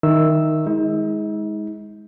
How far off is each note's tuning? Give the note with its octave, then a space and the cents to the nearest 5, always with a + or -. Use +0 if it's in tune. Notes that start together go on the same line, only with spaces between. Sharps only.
D#3 +0 E5 +0 E6 +0
G#3 +0 D#4 +40